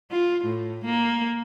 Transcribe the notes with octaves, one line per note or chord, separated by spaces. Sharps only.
F4
A2
A#3